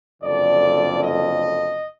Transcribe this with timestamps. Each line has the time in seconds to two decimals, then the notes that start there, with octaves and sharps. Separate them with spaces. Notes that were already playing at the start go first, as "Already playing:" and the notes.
0.23 F#1 F2 D3 D5
1.03 D#5